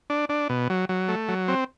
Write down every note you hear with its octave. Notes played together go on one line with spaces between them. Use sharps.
D4
D4
B2
F#3
F#3
A3
F#3
C4